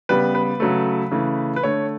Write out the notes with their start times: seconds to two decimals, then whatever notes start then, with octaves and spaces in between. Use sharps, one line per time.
0.09 C#3 G3 B3 B4
0.35 B4
0.60 C#3 F#3 A3
1.12 C#3 E3 A3
1.56 B4
1.63 D3 A3 C#5